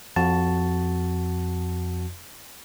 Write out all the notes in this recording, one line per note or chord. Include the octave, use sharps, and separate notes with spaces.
F2 F#4 A5